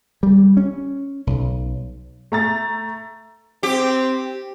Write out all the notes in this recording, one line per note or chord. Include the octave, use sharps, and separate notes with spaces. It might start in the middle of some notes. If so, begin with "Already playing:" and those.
G3
C#4
B1
A3 A#5 A6
C4 G4